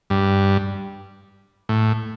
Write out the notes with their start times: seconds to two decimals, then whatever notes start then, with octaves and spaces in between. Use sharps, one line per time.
0.10 G2
1.69 A2